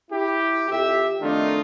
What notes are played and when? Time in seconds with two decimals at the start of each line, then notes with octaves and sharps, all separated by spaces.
0.11 E4 G4
0.70 F2 G4 E5
1.21 F2 D#3 A3 D4 D#4 F4